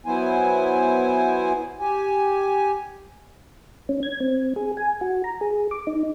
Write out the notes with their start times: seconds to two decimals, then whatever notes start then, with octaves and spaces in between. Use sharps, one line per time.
0.06 F#3 B3 E4 C5 G#5
1.80 G4 G#5
3.89 C#4
4.03 G#6
4.20 C4
4.56 G#4
4.77 G#5
5.01 F#4
5.24 A#5
5.41 G#4
5.71 D6
5.87 D#4